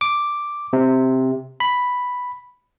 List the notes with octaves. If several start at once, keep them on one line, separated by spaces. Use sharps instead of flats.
D6
C3
B5